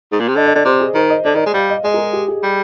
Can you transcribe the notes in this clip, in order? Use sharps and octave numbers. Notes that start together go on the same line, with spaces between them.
G#2
A#2
C3
D3 D#5
D#5
D3 D5
C3 C5
G#4
D#3 C5
D#5
D3 D5
D#3 D#5
G#3
G3 F5
D#5
G#3 D#5
A#4
G#4
G4
G#4
G3